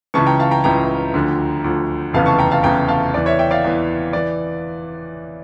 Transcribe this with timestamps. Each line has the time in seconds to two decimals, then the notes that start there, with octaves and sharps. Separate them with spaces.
0.14 C#2 C#3 E3 A5 C#6
0.26 G5 A#5
0.40 F5 A5
0.51 G5 A#5
0.64 C#2 C#3 E3 G5 A#5
1.14 D2 D3 F3
1.64 D2 D3 F3
2.13 F1 E2 C#3 E3 F5 A5
2.26 A5 C#6
2.39 G5 A#5
2.51 F5 A5
2.63 F1 E2 C#3 E3 G5 A#5
2.88 F5 A5
3.13 E2 E3 D5
3.26 C#5 E5
3.39 E5 G5
3.51 D5 F5
3.64 E2 E3
4.13 E3 D5